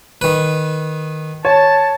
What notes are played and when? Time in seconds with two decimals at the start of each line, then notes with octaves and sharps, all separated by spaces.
0.21 D#3 B4
1.45 C#5 A5